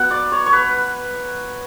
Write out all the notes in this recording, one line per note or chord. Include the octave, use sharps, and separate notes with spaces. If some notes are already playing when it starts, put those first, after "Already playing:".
Already playing: F#3 B3 F#5
D5
C#5
C#5
B4